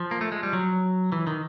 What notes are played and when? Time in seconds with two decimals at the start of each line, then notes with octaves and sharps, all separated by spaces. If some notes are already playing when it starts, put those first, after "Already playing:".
Already playing: F3
0.11 A#3
0.21 A3
0.32 G#3
0.43 G3
0.53 F#3
1.12 E3
1.27 D#3